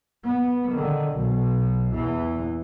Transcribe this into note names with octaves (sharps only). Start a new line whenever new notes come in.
B3
D3 D#3
B1 B2
E2 E3